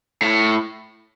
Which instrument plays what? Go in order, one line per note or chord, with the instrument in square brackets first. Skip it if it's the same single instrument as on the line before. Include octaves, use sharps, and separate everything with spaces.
[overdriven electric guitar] A2